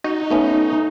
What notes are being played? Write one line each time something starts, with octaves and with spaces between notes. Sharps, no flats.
D#4 F#4
A3 B3 C#4